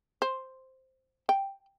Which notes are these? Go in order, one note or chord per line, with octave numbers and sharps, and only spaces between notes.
C5
G5